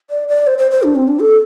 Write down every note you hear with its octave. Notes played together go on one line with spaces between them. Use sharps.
D5
D5
C5
C5
C5
D4
C4
D4
A4